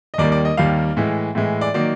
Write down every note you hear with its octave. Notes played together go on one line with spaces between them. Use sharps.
D#5
D#2 D#3 G3 A#3 D5
D5
D#5
D#2 D#3 G3 A#3 F5
A2 E3 G#3
A2 E3 G#3
D5
D#3 F#3 A#3 D5